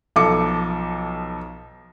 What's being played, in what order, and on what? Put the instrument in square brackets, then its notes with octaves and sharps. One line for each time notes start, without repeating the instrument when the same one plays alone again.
[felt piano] B1 F3 A4 D6 C#7